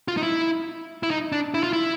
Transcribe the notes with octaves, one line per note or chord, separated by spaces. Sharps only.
F4
D#4
E4
E4
D#4
D4
E4
F4
E4